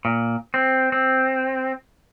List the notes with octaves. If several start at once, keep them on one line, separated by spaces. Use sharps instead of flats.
A#2
C4
C4